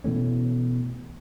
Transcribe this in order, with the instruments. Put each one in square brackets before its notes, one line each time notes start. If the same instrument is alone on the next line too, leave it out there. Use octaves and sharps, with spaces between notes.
[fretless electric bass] B2 E3 A3 C#4